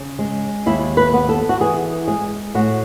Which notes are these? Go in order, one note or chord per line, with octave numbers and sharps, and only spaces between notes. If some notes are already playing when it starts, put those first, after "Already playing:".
Already playing: C#3
G#3
D#2 E4
B4
B3
A4
F#4
E3 G#4
G#3 G#4
A2 F#4